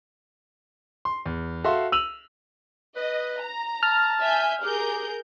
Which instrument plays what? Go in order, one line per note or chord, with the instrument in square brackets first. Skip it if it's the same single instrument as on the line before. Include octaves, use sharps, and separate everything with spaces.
[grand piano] C6
E2
F#4 A4 E5 F5 C6
E6 D#7 F7 F#7
[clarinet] B4 [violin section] D#5
[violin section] A#5
[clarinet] A5 [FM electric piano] F6
[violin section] E5 G#5 G6
[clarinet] G4 [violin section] G#4 A#4 G6